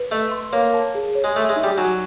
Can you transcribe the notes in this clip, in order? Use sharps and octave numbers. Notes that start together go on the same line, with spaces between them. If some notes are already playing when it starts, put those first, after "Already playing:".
Already playing: B4
A3 D#5
C6
A#3 C#5
A5
G#4
C#5
G#3
A3 E5
G#3
D#4
G3
F#3 G#5